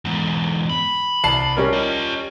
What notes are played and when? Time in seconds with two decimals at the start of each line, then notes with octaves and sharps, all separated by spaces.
0.05 E2 G#2
0.70 B5
1.24 C2 A5 C7
1.57 G3 C#4 A#4
1.73 F4 D#5